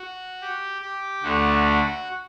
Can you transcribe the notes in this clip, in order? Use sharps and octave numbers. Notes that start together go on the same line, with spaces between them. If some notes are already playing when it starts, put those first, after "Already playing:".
Already playing: F#4
G4
G4
D2 D3 A3 F#4